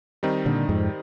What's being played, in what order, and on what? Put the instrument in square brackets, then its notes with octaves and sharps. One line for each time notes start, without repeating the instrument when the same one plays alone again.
[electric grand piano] D#3 G3 C4 D#4
[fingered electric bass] A#2 D3
F2 G#2